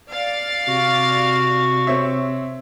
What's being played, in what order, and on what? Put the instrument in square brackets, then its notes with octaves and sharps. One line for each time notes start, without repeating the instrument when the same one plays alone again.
[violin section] D5 F5 A6
[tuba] C3 [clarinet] F#4
[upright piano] C4 C#5 E5